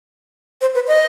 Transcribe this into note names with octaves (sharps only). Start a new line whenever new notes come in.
C5
B4
D#5